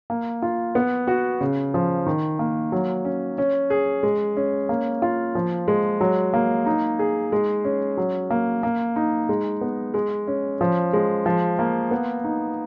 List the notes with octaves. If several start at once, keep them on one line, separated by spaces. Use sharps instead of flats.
A#3
F4
B3
F#4
C#3
F3
D#3
A#3
F#3
C#4
C#4
G#4
G#3
C#4
A#3
F4
F3
G#3
F#3
A#3
D#4
G#4
G#3
C#4
F#3
A#3
A#3
D#4
G#3
B3
G#3
C#4
F3
G#3
F3
A#3
B3
D#4